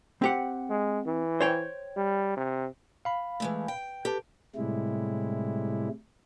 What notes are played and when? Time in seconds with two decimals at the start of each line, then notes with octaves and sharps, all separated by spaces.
0.22 C4 G4 F#5
0.70 G#3
1.06 E3
1.41 C5 C#5 G5
1.97 G3
2.37 C3
3.05 F5 B5
3.40 E3 G#3 A3
3.68 G5
4.05 G4 A4 B4 A5
4.56 A2 C3 G3 G#3 E4